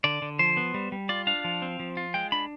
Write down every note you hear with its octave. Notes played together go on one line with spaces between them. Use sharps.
D3 D5
D3
F3 C5
B3
G3
G3
F4 D5
D4 F5
F3
C4
F3
F4
G#3 G5
D4 B5